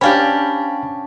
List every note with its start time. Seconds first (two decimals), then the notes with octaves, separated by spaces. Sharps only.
0.01 C#4 D4 G4 F5 G5 B5